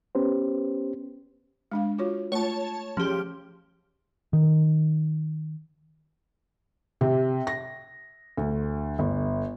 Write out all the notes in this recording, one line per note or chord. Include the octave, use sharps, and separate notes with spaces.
B3 C#4 G4 B4 C5
G#3 D4 F5
F4 F#4 C#5
A3 F4 C#5 A5
F3 C#4 G4 G#4
D#3
C3
A#6
D2
G1